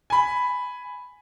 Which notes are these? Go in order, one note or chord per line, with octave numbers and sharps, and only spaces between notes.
G#5 B5